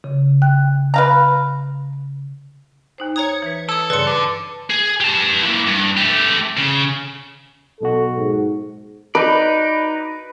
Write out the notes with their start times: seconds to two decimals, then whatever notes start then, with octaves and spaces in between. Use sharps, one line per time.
0.04 C#3
0.42 G5 F#6
0.94 B4 F5 A#5
2.98 D#2 D#4 C5
3.16 C#5 A#5 D#6 G#6 C#7
3.42 E3 B4
3.69 A4 D#6 E6
3.90 G2 C#3 B4 D5 C6 C#7
4.07 D3 A5
4.70 G#4
5.00 G4 A5
5.43 A#3 E4
5.67 G2
5.97 A3 G4
6.57 C#3
7.81 B1 B2 F#4 A4
8.17 G#2
9.15 D#4 B4 D5